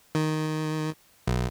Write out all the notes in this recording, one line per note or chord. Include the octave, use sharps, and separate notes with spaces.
D#3
B1